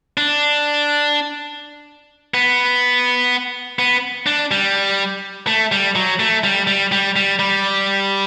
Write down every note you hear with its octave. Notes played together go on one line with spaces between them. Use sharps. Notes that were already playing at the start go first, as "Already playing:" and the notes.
D4
B3
B3
D4
G3
A3
G3
F#3
A3
G3
G3
G3
G3
G3